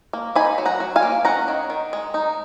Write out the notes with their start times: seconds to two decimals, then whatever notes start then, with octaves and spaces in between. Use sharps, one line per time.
0.13 A#3
0.36 D#4 G#5 B5
0.58 F#3
0.65 F#5 A#5
0.80 F#3
0.96 F5 G#5
1.03 A#3
1.25 C#4 F#5 A#5
1.48 D#3
1.70 D#3
1.93 G#3
2.14 D#4